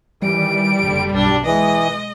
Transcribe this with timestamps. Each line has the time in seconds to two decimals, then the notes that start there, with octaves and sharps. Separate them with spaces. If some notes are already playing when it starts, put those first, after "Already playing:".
0.22 D#3 E3 G3 D7
0.80 F#1 D3
1.13 B1 G2 D4
1.46 E3 G#3 D#5